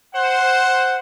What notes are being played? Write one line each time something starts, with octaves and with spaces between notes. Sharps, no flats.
C5 F#5